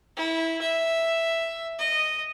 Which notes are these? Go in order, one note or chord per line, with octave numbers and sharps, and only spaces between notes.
E4
E5
D#5